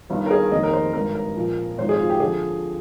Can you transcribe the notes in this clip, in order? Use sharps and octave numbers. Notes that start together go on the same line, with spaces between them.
G1 G2 D#3
A#4
G#4
F1 D#2 D#3 D#5
A#4
C5
G#1 G2 D#3 A#4
A#4
A#1 A#2 F3
G#1 G#2 F3 C5
G#4
F4
G4
D3 F3 G#4